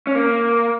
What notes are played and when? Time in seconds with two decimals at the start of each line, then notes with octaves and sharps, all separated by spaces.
0.07 C#4
0.15 A#3